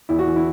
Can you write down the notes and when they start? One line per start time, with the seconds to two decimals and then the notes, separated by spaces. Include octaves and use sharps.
0.09 E2 E4
0.19 F#4
0.27 E3
0.36 E4